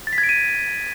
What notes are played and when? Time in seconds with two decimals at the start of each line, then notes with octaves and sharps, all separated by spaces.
0.07 A6
0.13 B6
0.18 G#6
0.24 D7
0.29 D#7